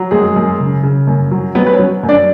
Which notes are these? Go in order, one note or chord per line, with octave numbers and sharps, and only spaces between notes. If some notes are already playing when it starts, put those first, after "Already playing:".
Already playing: F#3
F#2 G#3 G#4
F#2
C#3
C#3
F#2
F#3
F#3 B3 B4
B4
C#4 C#5
F#3
F#2
D4 D5